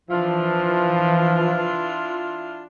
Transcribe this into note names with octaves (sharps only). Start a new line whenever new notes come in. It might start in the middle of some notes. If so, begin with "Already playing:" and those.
E3 F3 D4 E4 F4